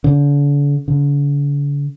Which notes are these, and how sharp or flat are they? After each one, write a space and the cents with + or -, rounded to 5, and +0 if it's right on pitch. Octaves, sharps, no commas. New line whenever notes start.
D3 -40
D3 -45